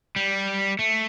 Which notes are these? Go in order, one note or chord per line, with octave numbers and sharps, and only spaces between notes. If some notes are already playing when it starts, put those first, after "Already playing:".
G3
A3